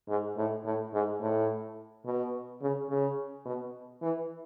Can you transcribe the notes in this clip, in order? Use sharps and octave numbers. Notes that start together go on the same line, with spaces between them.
G#2
A2
A2
G#2
A2
B2
C#3
C#3
B2
E3